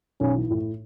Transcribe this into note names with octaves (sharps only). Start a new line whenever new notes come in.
B1 C#4
E3
A2